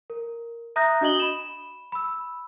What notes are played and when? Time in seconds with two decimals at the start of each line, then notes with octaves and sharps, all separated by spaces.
0.10 A#4
0.76 E5 A#5 D#6 F#6 G6 A#6
1.01 D4 F#4 D#5 D#6 F#7 G7
1.20 B5 E7
1.92 B5 E6